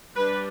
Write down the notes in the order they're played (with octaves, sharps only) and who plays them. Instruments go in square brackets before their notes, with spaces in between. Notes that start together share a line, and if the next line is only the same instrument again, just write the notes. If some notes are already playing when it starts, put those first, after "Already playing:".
[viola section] G3 D4 B4